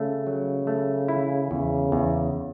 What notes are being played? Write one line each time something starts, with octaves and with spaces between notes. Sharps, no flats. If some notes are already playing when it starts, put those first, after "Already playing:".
Already playing: C#3 A3
F#3
A3
E4
E2 C#3
E2